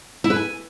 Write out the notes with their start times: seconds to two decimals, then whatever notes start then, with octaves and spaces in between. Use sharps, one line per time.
0.24 E4
0.30 B4
0.36 G#5